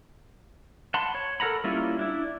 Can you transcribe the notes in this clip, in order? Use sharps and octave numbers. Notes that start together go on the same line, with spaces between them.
F#5 A5 B5 C6
C#5
A4 A#4 F#5 A#5 B5
G3 A#3 C#4 E4 F4
D4 E4